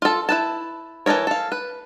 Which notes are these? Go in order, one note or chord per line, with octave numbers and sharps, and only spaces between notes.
F4 A4
E4 B4 A5
E3 D4 A4 A#4 C#5
A4 F5
B4